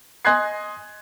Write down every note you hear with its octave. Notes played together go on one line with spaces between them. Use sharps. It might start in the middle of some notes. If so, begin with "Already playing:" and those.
D#5 G#5 C6 F#6 G#6 C7